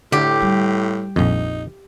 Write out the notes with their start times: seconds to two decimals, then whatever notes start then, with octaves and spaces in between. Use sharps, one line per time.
0.12 A2 D3 G4
0.41 G3
1.16 A#1 F2 D#4